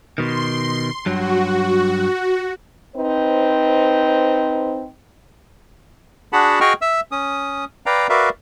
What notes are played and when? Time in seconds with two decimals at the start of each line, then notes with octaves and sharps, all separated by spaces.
0.18 B2 D#3 C6
1.06 G2 F#3 F#4
2.96 C4 D#4 B4 C5
6.33 D4 F#4 G#4 F#5 A5 B5
6.60 F#4 G#4 D#5 G5 C#6 F6
6.82 E5 E6
7.12 C#4 D#6
7.86 B4 D5 F5 G5 A#5
8.09 F#4 A#4 B4 D5 E5 F5